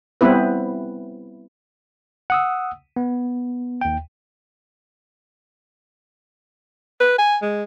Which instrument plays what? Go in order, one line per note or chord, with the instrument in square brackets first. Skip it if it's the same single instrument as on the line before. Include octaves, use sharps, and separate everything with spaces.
[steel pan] G3 B3 C4 E4 B4
[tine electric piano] F#5 D#6 E6
B3
D#2 G5
[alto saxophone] B4
G#5
G#3